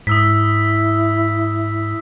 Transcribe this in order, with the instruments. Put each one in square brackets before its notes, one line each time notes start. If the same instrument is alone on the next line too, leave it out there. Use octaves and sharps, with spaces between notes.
[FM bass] G#2 [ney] E4 [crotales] D#6 E6 B6